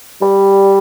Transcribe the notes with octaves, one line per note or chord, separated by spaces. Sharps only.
G3